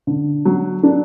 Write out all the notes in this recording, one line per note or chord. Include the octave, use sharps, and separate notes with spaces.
D3
F#3
D4